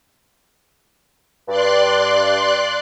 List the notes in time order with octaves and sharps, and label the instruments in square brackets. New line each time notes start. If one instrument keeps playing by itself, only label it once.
[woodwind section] G2 [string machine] D5 C6 F#6